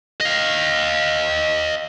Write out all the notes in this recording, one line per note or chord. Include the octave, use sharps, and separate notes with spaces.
D#5 F5